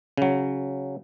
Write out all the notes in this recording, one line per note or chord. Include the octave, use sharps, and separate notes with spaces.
C#3 F#3